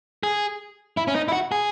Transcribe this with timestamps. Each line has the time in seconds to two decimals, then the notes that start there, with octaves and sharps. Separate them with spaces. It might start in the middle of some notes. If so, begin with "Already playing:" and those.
0.23 G#4
0.97 E4
1.08 C#4
1.16 D#4
1.28 E4
1.33 F#4
1.52 G#4